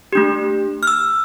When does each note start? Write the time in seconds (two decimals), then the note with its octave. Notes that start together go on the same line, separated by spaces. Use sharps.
0.13 A3 D4 G4
0.83 F6
0.87 E6